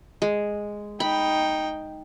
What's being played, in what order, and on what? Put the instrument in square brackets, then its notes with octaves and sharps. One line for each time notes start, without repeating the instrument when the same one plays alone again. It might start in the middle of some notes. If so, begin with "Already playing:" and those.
[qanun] G#3
[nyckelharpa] D#4 G5 [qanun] B5